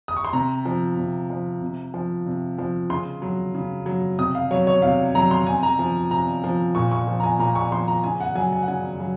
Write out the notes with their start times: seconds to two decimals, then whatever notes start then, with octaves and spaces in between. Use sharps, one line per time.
0.08 D#6
0.17 C#6
0.25 C6
0.33 C3 A#5
0.65 F3
0.97 C3
1.30 F3
1.62 C3
1.94 F3
2.26 C3
2.58 F3
2.90 C#3 C6
3.22 F#3
3.55 C#3
3.86 F#3
4.19 C3 D#6
4.35 F5
4.51 F#3 C#5
4.67 C#5
4.82 C3 F5
5.15 F#3 A#5
5.31 C6
5.47 C3 G#5
5.63 A#5
5.79 F3
6.11 C3 A#5
6.44 F3
6.75 A#2 C#6
6.91 C#6
7.07 F3
7.20 A#5
7.23 G#5
7.39 A#2 A#5
7.55 C#6
7.72 F3 C6
7.88 A#5
8.04 C#3 G#5
8.20 F#5
8.35 F#3 G#5
8.53 G#5
8.63 F#5
8.68 C#3 G#5
9.00 F#3